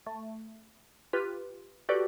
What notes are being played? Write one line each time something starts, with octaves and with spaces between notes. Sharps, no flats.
A3
F4 G4 B4
F#4 G4 A4 B4 D5